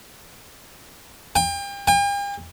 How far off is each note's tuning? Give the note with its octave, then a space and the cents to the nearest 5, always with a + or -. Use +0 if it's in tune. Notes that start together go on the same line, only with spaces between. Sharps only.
G5 +35
G5 +45